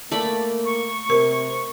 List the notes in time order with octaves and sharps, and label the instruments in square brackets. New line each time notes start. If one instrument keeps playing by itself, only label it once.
[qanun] A3 D5 B5 [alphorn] A#3
[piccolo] C#6
[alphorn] C3 [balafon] A#4